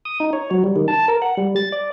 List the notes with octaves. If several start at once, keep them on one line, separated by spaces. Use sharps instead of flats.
D#6
D#4
C#5
F#3
G3
D#3
A5
A#4
F#5
G3
A6
D5